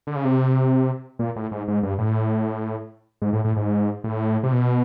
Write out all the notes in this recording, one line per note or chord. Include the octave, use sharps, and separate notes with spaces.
D3
C#3
C3
A#2
A2
G#2
G#2
G2
A2
G#2
A2
A2
G#2
A2
C3
B2